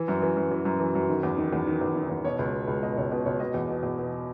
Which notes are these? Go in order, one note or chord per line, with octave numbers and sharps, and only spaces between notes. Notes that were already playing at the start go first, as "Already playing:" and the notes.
Already playing: E3
F#2
E3
F#2
E3
F#2
E3
F#2
D#3
E2
D#3
E2
D#3
E2
D#3
E2
B2 C#5
C#2
B2
C#2
B2 D#5
C#2 C#5
B2 B4
C#2 C#5
B2 D#5
E2
B2
E2
B2